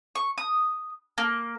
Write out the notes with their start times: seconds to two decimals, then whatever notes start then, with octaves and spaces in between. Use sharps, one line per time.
0.15 C#6
0.38 D#6
1.18 A#3